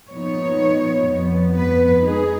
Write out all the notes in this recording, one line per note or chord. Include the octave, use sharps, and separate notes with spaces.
A#2 F3 B3 D#4 C#5
F2 F3 B3
B4
G#3 D#4 G#4